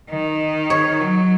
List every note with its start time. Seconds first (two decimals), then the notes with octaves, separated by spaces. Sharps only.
0.10 D#3
0.70 C#5
1.00 F#3